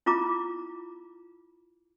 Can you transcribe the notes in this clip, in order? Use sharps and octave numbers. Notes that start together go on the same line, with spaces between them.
E4 F4 A#5 D6